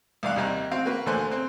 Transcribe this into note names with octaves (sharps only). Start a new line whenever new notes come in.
C2 D5 F5 F#6
D#2 C3 G3 F#6
C4 F#4 F5
A#3 F#4 B4
D2 D3 A#3 C5 G#5 F#6
C4 C5